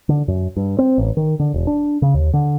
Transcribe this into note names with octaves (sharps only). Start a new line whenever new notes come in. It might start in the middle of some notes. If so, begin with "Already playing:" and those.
D3
F#2
G2
C4
A1
D#3
D3
E1
D4
C#3
D#2
D3